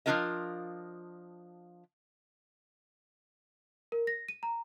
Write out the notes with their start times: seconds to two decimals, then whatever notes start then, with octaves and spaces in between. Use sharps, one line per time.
0.06 F3 G3 D4 F4 A#4 D#5
3.92 A#4
4.07 A#6
4.29 D#7
4.43 A#5